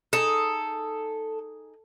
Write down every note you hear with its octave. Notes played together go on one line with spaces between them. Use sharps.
D#4 F4 G#4 A4